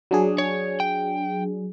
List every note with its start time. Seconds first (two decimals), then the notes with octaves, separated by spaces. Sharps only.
0.11 F#3 D4 G#4
0.38 C#5
0.80 G5